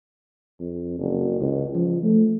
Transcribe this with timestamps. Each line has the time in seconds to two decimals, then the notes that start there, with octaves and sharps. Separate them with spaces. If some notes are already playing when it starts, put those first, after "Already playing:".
0.60 F2
0.99 F#1
1.40 C#2
1.75 F3
2.03 A3